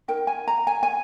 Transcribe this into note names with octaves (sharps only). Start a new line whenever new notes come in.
D#4 A#4 G5
G#5
A#5
G#5
G#5